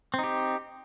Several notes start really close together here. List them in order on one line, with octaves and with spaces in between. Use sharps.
C4 D#4 G4